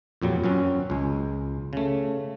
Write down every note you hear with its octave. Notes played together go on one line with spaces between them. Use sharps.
F2 A#2 F#3 G3
F#2 F#3 C4 C#4 F#4
C#2 G#3
C#3 A3